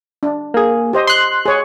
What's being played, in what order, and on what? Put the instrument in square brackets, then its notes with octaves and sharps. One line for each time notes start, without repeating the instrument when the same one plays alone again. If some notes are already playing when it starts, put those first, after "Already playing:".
[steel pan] D4
[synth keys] A#3 G#4
[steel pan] G4 C5 D#5
[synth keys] C6 F#6
[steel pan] G#4 C#5